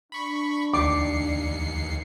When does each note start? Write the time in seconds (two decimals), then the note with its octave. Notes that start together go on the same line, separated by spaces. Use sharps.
0.12 D4 B5 C#6
0.74 D#2 D6 C7 C#7